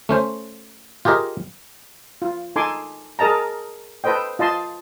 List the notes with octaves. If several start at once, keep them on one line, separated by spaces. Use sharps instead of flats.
A3 C#4 C5
F4 G4 G#4 A#4 D#5
F4
D#4 A4 G#5 C6 D6
G#4 A#4 D#5 A5 A#5
A4 B4 C5 D#5 G5
F4 D#5 A5 C6